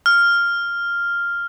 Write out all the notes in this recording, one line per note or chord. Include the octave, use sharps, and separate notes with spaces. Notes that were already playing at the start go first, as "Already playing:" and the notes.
F6